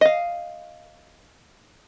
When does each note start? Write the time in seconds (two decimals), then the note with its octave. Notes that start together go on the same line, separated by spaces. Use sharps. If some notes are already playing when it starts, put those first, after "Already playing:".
0.01 D#5 F5